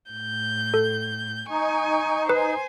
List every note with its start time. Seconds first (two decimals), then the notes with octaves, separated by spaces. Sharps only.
0.10 A2 G6
0.74 A4
1.50 D#4 G#5 C#6
2.29 B4 C5 G#5